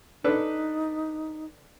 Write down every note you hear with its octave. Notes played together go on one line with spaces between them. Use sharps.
D4 D#4 A4 B4